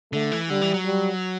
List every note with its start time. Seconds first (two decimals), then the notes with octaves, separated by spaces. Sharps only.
0.13 D3 A3
0.32 E3
0.50 D3 G3
0.62 E3
0.74 F#3
0.86 G3